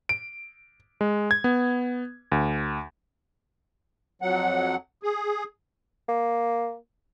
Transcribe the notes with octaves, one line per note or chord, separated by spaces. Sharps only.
D7
G#3
G#6
B3
D2
F2 F#3 F#5
G#4
A#3